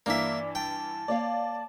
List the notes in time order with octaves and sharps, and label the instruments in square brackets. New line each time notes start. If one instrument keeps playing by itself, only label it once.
[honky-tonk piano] G2 E3 B6 [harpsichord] A#3 E5 [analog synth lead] D5
[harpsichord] G5 [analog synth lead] A5
[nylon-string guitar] A#3 C#5 F5 [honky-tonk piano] D5